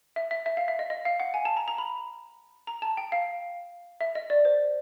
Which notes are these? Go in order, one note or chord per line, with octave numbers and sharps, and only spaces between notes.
E5
E5
E5
F5
E5
D#5
D#5
F5
F#5
G#5
A5
A#5
A#5
B5
A#5
A5
G5
F5
E5
D#5
D5
C5